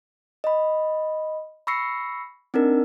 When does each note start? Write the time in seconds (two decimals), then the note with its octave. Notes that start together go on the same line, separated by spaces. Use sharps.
0.44 D#5 B5
1.67 B5 C#6 E6 A#6 C7 C#7
2.54 C4 D4 D#4 A#4